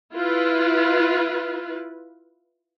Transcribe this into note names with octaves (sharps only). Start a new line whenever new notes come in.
E4 F4 B4